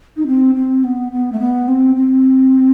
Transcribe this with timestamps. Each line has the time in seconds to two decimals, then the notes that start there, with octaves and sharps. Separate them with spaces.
0.17 D#4
0.27 C4
0.55 C4
0.84 B3
1.12 B3
1.32 A3
1.40 B3
1.68 C4
1.96 C4